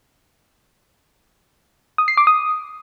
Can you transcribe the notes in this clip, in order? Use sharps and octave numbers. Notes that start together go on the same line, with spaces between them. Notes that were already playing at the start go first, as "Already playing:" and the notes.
D#6
C7
D6
D#6